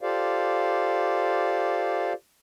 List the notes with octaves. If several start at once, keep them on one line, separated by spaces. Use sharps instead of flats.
F4 G4 A4 C5 D5 F5